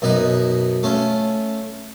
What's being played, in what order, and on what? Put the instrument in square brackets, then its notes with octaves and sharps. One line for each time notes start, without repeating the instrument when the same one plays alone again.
[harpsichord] F#2 B2 D#4 B4
A3 C#4 F4